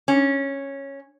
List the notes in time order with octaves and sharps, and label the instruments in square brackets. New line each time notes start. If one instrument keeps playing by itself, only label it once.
[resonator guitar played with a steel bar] C#4